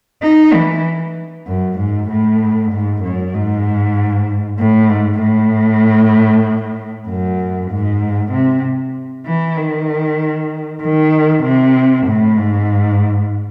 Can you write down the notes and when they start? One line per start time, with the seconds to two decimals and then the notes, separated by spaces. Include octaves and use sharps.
0.22 D#4
0.54 E3
1.47 F#2
1.78 G#2
2.09 A2
2.72 G#2
3.03 F#2
3.34 G#2
4.59 A2
4.89 G#2
5.21 A2
7.08 F#2
7.70 G#2
8.32 C3
9.26 E3
9.57 D#3
10.82 D#3
11.43 C3
12.06 A2
12.37 G#2